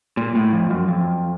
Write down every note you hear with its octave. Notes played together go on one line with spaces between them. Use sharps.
A#2
A2
F2
F#2
F2